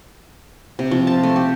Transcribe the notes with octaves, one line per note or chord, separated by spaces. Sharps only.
C3
F3
A5
A3
G4